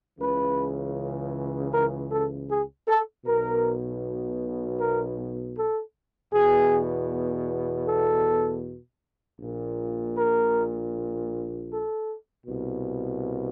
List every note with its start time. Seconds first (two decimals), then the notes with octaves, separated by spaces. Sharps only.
0.19 C#2 C#3 E3 B4
1.72 A#4
2.11 A4
2.50 G#4
2.88 A4
3.25 B1 B2 A#4
4.79 A#4
5.56 A4
6.33 E2 B2 G#4
7.86 A4
9.39 A#1 A#2
10.17 A#4
11.70 A4
12.47 C2 B2